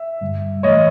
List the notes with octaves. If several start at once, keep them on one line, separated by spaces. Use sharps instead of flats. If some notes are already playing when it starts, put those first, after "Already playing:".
Already playing: E5
G2 D3 G3
A2 E3 A3 C#5 D#5